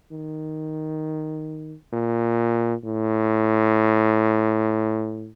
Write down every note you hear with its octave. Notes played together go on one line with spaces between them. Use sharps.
D#3
A#2
A2